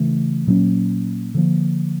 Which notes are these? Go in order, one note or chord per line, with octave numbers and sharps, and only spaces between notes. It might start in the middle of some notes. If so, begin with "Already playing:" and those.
Already playing: C#3 E3 A3
A#2 F#3 A#3 C#4
D3 F3 A#3